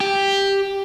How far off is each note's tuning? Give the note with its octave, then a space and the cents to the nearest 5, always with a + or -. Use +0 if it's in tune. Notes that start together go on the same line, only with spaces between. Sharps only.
G4 +5